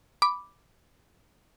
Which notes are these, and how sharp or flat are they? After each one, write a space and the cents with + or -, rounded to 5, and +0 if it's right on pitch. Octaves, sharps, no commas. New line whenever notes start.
B5 +0 D6 +0